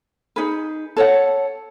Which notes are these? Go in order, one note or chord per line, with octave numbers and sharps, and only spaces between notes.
D#4 G#4 B4
A4 C#5 F#5